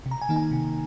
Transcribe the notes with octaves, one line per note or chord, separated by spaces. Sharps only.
C3
A#5
G#5
D#3 A#3 D#4
G#5
C3